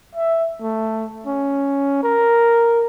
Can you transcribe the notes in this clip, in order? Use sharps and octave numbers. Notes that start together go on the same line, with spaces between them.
E5
A3
C#4
A#4